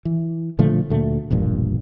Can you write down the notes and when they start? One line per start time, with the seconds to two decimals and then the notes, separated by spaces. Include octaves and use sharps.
0.05 E3
0.59 A#2 D3 F3 A3
0.90 D2 A#2 A3
1.31 E1 A#1 G2 A#2